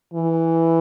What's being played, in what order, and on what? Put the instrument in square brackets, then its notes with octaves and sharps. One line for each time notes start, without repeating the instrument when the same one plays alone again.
[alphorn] E3